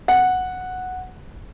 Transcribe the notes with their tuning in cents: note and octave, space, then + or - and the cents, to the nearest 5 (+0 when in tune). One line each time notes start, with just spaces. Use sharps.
F#5 -5